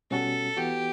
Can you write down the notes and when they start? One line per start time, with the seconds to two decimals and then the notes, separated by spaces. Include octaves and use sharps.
0.11 B2 G3 C#4 F#4 A4
0.57 E3 B3 F#4 G4